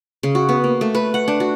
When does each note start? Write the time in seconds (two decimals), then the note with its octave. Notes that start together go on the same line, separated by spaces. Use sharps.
0.23 C#3
0.35 F#4
0.49 B3
0.64 A#3
0.81 A3
0.95 B4
1.14 F#5
1.28 D4
1.40 F#4